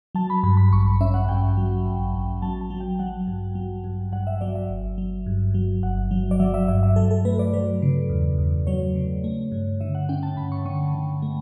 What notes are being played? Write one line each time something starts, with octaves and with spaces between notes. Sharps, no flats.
F#3 A5
B5
G2 B5
B5
A1 C#6
B5
C#4 E5
F#5
G2 G5
F#3
A1
A1
F#3 A5
A5
F#3
G5
F#3 F#5
G2
F#3
G2
G2 F#5
E5
F#3 D5
E5
G1
F#3
G2
F#3
G1 F#5
F#3
D5
F#3 E5
E5
G2 E5
E5
F#3 A4
A4
A3 B4
D5
F#3 B4
C#3
E2
E2
F#3 C#5
C#3
A3
G2
D3 E5
F#5
C#4 G5
A5
G2 B5
C#6
D3 C#6
D3
A3